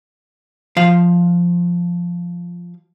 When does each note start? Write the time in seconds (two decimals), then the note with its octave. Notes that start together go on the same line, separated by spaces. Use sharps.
0.77 F3 F5